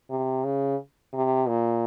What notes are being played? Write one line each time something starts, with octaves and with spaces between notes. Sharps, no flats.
C3
C#3
C3
A#2